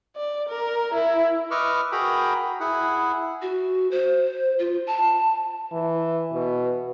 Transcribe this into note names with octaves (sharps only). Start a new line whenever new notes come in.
D5
A#4
E4
B4 D#5 C#6 D6 E6 F6
F#4 G#4 A#4 G5 A#5 B5
E4 G#4 F#5
F#4
C5
F4
A5
E3
B2